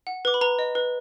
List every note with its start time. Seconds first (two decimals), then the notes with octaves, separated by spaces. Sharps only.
0.07 F#5
0.25 B4 D6
0.34 B5
0.41 B4 A#5
0.59 D#5
0.75 B4